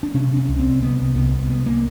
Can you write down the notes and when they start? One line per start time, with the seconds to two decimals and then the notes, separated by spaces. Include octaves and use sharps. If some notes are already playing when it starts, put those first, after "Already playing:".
0.03 D4
0.14 C3 C#4
0.37 C#4
0.49 C2
0.59 C4
0.82 C3 B3
1.15 C2 B3
1.50 C3 B3
1.66 A#3